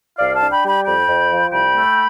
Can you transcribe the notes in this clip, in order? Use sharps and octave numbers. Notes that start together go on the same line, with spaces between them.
C2 D5 F5
F5 A5
D4
G5 B5
G3
G5 B5
F2 G5 B5
F2
F3
C2 G5 B5
A3